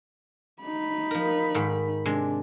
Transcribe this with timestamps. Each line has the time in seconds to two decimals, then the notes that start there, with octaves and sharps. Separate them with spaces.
0.61 D#4 B5
1.11 F3 A#4
1.55 G#2 D#3
2.06 C3 G#3 D4